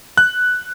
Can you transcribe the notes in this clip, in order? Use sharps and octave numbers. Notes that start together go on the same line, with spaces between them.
F#6